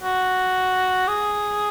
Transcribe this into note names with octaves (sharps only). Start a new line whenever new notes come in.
F#4
G#4